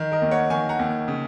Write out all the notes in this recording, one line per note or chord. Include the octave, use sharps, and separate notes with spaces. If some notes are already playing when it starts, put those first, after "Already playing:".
Already playing: D#3
A#4 D#5
D#2
C#5 F#5
D#3 G#5 C#6
F#5 A#5
D#2
C#3